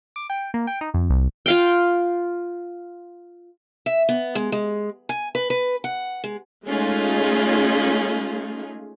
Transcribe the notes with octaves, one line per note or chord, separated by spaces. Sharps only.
D6
G5
A#3
G5
D#4
F2
C2
F4 F5 G5
E5
B3
G#3
G#3
G#5
B4
B4
F#5
G#3
G#3 A3 C#4 D#4 F4 G#4